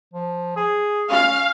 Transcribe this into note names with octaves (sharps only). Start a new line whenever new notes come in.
F3
G#4
C#4 F5